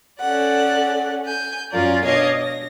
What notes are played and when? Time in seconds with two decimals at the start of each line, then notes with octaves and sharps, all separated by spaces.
0.20 C#4 A4 D5 F#5
1.26 G#5 G6
1.73 F#2 F#3 C#4 F4 A#4 D5
2.05 B2 D4 C#5 D#5 F5 G#6
2.37 A#6